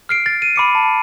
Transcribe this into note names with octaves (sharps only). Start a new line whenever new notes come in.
F6 C7 D7
A6
D#7
B5 D6 C#7
A5